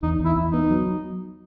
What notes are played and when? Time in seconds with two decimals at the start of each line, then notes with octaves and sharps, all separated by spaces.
0.03 E2 D#4
0.20 E2
0.25 E4
0.37 E2
0.48 D#4
0.54 B3
0.71 F#3